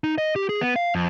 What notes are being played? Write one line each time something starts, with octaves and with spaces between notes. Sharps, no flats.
D#4
D#5
G4
G#4
B3
F5
F2